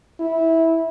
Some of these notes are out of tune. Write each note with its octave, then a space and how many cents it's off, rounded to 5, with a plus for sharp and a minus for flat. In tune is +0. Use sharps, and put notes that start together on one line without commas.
E4 -15